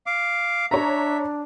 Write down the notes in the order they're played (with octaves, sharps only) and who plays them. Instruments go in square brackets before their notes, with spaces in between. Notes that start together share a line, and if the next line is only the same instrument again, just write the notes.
[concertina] F5 D6
[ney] D4 [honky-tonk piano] C#5 A#5 [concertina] E5